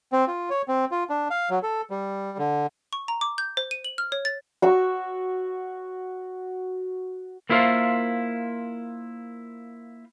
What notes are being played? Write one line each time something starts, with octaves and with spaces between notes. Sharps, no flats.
C4
F4
C#5
C4
F4
D4
F5
F#3
A4
G3
D3
C#6
A#5
D6
G6
C5
D#7
F#7
F6
C#5
A6
F#4 C#6 E6
A#3 E4 F4 A#4 C5 E5